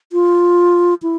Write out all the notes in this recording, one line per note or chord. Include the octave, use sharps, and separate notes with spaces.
F4
E4